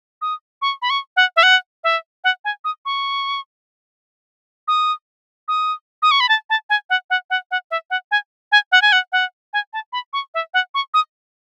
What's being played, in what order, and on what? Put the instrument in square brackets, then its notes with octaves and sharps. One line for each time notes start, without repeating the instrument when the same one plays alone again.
[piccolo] D#6
C#6
B5
C#6
F#5
E5
F#5
E5
F#5
G#5
D#6
C#6
D#6
D#6
D#6
C#6
B5
A5
A5
G#5
F#5
F#5
F#5
F#5
E5
F#5
G#5
G#5
F#5
G#5
F#5
F#5
G#5
A5
B5
C#6
E5
F#5
C#6
D#6